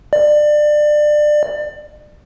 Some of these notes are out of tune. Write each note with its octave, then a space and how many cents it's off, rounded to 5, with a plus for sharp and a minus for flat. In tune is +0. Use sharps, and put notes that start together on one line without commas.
D5 +25